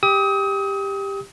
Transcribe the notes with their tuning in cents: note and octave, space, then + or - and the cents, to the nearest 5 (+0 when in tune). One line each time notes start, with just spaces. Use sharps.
G4 +10 D#6 +35